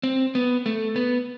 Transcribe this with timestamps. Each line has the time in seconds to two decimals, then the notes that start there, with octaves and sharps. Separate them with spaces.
0.03 C4
0.35 B3
0.66 A3
0.96 B3